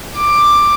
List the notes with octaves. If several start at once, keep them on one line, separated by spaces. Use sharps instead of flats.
D6